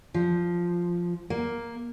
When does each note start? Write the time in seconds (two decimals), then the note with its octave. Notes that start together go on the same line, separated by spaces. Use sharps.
0.14 F3
1.30 A#3